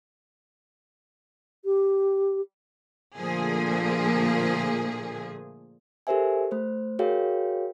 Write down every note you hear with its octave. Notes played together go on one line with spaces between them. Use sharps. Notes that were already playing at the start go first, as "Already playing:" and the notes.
G4
A#2 D3 F3 A3 A#3 G#4
G4 A4 A#4 C5 E5 G#5
A3 C5
F#4 G#4 A#4 C#5 F5 G5